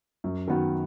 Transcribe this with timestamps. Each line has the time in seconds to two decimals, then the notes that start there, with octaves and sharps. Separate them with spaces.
0.24 F#2
0.48 D#3 B3 F#4